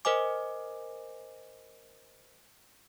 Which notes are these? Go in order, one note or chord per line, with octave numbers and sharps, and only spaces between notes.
A#4 C5 D#5 G#5 D6